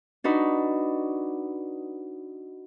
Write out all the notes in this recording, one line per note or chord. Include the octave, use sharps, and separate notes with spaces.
D4 D#4 F#4 B4